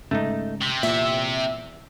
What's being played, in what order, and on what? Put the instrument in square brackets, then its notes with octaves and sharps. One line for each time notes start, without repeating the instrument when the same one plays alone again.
[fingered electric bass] G#2 C#3 [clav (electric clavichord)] A3 D#4
[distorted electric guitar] C3
[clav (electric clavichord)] E2 [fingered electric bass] A#2 [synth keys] E5